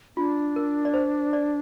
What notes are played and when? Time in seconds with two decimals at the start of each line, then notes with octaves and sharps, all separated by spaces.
0.17 D4 F4
0.56 A#4
0.85 D5
0.94 C5
1.33 D5